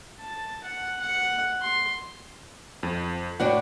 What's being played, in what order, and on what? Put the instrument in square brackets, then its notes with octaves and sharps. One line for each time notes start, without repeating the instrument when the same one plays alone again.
[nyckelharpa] A5
F#5
F#5
C6
[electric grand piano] F2
[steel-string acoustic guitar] A2 D4 F#4 [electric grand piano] F#5 G5 B5